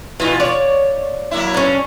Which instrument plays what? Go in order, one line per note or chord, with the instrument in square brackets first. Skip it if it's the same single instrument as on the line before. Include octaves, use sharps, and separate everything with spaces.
[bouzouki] B2 E3 [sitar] B3 F4
[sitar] C#5 [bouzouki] D5
[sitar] F#3 A#3 E4
[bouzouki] C#4 D4